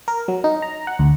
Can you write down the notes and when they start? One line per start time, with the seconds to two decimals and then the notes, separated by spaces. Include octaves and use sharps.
0.08 A#4
0.28 F#3
0.44 D#4
0.62 A#5
0.87 F#5
0.99 D2